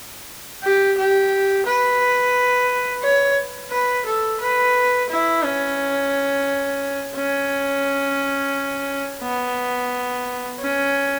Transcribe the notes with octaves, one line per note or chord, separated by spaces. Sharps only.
G4
G4
B4
C#5
B4
A4
B4
E4
C#4
C#4
B3
C#4